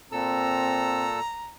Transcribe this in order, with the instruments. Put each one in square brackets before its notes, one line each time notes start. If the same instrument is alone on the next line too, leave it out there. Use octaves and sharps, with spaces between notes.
[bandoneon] A#2 A4 E6 [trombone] C4 [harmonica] A#5